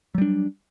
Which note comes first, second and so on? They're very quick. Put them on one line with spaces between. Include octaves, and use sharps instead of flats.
F#3 G3 D4